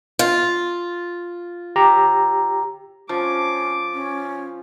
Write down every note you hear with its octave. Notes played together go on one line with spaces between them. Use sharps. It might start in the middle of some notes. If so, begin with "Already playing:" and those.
F4
G4 A#5
F3 C#4 D6
C#4